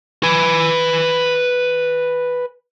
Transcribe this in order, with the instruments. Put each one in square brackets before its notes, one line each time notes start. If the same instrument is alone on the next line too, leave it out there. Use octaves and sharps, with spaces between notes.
[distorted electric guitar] B4 G#5